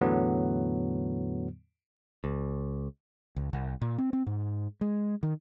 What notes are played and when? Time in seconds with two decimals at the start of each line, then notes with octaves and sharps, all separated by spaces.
0.01 E2 A2 D3 F#3 B3
2.24 C#2
3.36 C#2
3.53 C2
3.81 A#2
3.98 C4
4.13 C4
4.27 G#2
4.81 G#3
5.23 D#3